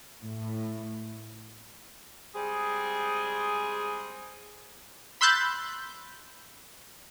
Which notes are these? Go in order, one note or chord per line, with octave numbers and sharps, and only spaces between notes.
A2
G3 G#3 C4 G#4
B5 C6 E6 F#6 G6 A6